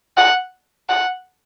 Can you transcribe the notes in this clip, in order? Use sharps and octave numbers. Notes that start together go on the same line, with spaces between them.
F#5
F#5